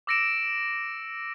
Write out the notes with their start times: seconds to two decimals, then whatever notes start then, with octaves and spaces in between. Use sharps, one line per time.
0.07 D6 E6 A#6 C#7 D7 E7